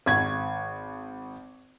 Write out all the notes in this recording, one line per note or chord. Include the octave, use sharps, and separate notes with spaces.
G#1 G#6